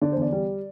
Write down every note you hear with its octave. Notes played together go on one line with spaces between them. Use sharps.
D3 D5
E2 C5
D5
G3